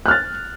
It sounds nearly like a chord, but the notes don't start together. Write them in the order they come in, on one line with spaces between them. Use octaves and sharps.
F#6 F6 A6